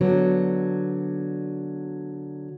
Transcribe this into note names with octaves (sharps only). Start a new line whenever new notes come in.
D3 F#3 B3